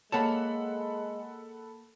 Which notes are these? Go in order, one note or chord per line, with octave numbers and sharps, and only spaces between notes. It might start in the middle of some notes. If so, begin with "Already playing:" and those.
G#3 A#3 A4 C#5 F#5 A5 B5